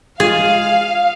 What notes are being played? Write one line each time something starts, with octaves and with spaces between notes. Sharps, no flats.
G#3 F4 G#4 F5